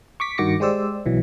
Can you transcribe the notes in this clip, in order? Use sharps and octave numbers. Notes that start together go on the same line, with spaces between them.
C#6 D6 B6
G2 D#3 F#4 D6 A#6 C#7
G#3 G4 C5 D5 E6
B1 E3 F#3